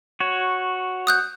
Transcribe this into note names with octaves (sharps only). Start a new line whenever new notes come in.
F#4 C#5
D#6 F#6 G6